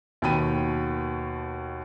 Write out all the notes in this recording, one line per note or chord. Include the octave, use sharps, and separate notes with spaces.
D#2 B2 D#3 G5 B5 D#7